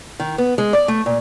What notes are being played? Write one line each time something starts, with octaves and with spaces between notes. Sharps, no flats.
D#3
B3
G#3
D5
A3
A#2